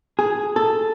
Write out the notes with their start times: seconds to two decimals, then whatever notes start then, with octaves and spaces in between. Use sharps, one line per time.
0.19 G#4
0.56 A4